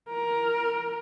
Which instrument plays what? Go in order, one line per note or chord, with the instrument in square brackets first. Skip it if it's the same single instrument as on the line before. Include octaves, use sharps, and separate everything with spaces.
[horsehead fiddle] A#4